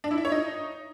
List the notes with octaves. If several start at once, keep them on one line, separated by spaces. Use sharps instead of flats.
D4
E4
E5
C#5
D#4